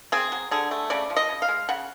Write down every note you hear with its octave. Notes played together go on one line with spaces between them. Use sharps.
C4 G#4
F#3
D3 G#4
A3
C#3 D5
F3
D#5
C#3
F5
G#3
C#3 F#5